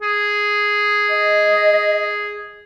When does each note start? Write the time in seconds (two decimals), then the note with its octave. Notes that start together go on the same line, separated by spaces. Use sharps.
0.02 G#4
1.09 D#5